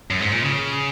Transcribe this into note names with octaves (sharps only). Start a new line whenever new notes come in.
F#2
G#2
A#2
C#3